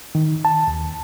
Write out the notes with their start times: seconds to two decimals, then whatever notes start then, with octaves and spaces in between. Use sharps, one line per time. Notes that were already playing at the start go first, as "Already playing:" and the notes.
0.15 D#3
0.45 A5
0.68 D#2